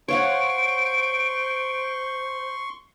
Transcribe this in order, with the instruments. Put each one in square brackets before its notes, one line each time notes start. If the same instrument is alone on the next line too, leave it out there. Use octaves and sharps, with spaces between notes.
[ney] C5 [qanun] C#5 F5 F#5 [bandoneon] C6 C#6 [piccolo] D7